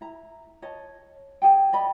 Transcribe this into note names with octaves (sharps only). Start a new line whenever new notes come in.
E4 A#5
C#5 D#5 A5
G#4 F#5 G5
D5 D#5 B5